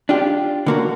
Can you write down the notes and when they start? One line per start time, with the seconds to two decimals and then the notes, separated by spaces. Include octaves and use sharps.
0.09 D4 F4 G4
0.66 D3 A#3 F#4